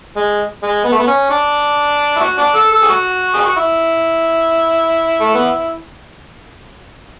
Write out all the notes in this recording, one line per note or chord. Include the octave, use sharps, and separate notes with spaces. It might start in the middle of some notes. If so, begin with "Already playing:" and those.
G#3
G#3
B3
A3
B3
C#4
D4
E4
F#4
D4
A4
A4
G#4
F#4
G#4
F#4
E4
A3
B3